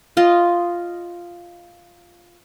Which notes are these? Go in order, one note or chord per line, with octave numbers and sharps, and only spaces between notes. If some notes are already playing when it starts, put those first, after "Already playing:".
F4 D#5